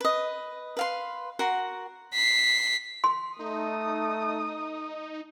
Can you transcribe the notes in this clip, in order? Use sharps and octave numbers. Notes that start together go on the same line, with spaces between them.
B4 D#5
B4 F5 C6
F#4 A#4 F#5 C6
B6 C7
C6
A3 D#4 D#6